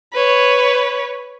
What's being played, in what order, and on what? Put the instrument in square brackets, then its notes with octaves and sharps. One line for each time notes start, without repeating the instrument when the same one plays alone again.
[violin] B4 C#5